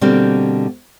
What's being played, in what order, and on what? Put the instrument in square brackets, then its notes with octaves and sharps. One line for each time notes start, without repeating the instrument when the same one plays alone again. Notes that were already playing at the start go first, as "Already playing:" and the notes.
[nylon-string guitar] B2 D3 G3 A#3 C4